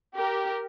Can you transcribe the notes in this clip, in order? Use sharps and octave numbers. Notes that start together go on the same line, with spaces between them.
G4 A#4